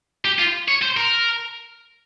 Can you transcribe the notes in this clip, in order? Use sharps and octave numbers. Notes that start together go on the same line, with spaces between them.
G4
F4
C#5
C5
A#4